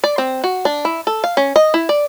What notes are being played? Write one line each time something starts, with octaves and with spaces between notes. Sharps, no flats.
D5
C4
F#4
D4
E4
A4
F5
C#4
D#5
E4
D5